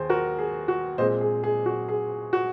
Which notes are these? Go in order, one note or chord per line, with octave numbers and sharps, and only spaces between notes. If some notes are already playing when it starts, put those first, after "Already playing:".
Already playing: D#2 G#4 C5
F#4 A#4
G#4
F#4
A#2 G#3 C4 C5 D#5
G#4
G#4
F#4
G#4
F#4